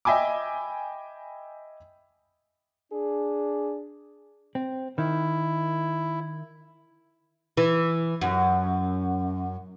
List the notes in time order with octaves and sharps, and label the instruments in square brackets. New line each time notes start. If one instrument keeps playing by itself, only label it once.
[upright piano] D#5 E5 G5 G#5 B5 D6
[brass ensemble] D4 G#4
[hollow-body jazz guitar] C4
[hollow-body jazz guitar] D#3 [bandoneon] E4
[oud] E3
F#2